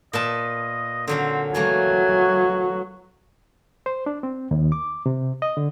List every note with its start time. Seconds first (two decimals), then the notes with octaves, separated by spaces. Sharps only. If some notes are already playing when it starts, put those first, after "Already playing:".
0.13 A#2 B4 D#5 A5
1.08 D3 F#3 C4 C#4
1.55 E3 F#3 A3 A#3 G#5
3.86 C5
4.06 D4
4.23 C4
4.51 D#2
4.72 D6
5.06 C3
5.42 D#5
5.57 D3